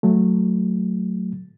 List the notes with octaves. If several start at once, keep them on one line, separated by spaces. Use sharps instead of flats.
F#3 A3